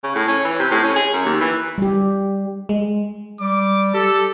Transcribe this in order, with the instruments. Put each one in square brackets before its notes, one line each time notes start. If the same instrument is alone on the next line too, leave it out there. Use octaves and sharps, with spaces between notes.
[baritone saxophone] C#3
A2
C#4
E3
C3
A2
C#4
G#4
F#2
D#2
E3
[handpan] G3 G4
[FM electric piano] G#3
[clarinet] G3 [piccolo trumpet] D6
[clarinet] G4 [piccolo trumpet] A4